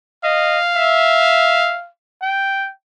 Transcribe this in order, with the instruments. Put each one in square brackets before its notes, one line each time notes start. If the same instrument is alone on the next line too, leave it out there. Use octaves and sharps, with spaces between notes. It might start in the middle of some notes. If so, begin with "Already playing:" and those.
[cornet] D#5 [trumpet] F5
[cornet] E5
G5